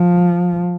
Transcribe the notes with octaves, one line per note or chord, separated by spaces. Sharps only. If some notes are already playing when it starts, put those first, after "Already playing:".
Already playing: F3